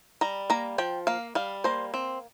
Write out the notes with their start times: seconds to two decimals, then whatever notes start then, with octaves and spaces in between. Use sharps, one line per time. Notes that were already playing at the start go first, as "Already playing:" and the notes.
0.21 G3 A#5
0.50 A#3 A#5
0.78 F3 G5
1.07 A#3 F5
1.35 G3 F5
1.64 A#3 C5
1.94 C4